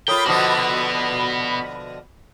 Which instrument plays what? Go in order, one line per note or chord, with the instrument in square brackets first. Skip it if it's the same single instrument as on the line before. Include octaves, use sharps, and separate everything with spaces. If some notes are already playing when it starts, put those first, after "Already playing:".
[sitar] A#3 F4 [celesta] A4 C#5 D#6 [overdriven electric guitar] G5 [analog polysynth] B5
[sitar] B2 D3 F3 [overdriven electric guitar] B3 F#4 [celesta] D6 D#6